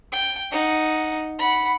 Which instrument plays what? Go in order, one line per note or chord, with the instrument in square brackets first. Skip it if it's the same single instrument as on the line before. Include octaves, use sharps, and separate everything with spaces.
[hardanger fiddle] G5
D#4 F#5
F#5 B5